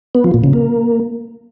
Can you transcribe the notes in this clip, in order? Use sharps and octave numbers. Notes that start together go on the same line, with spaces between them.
B3
F3
A#2
C#3
A#3